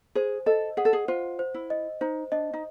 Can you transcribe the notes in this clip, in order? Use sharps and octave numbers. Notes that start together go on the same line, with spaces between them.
G#4 C5
A4 D#5
G#4 F#5
A4
G#4
F4 C5
C5
E4
D#5
D#4 C5
D4 D#5
D#4